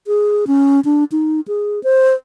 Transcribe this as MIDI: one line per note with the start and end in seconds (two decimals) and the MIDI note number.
0.07 0.45 68
0.47 0.80 61
0.85 1.04 62
1.12 1.40 63
1.48 1.82 68
1.83 2.14 72